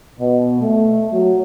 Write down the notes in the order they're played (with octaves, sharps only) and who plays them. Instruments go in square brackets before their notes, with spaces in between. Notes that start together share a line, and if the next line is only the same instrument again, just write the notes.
[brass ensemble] B2
A3
F#3